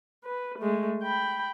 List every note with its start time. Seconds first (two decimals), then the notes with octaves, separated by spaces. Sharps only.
0.24 B4
0.59 G#3 A3
1.03 G5 B5